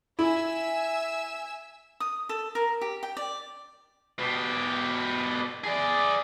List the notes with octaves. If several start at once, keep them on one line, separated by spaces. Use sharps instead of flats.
E4 E5 G#5 E6
D#6
A4
A#4
G4
G5
D5
B2 G4
G#4 D5